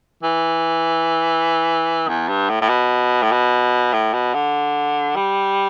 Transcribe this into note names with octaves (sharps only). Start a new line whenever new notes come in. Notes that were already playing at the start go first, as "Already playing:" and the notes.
E3
E2
G2
A2
A2
B2
A2
B2
A2
B2
D3
G3